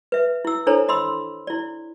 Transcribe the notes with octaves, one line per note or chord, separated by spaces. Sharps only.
B4 E5
E4 E6
D4 E4 A4 C5 C#5 A#5
D#5 B5 C6 E6
E4 D5